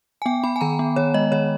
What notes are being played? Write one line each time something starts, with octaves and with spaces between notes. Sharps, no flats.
G#5
B3 G5
B3 B5
G#5
D#3 A#5
B3
D#3 C#5
G#3 D#5
D#3 C#5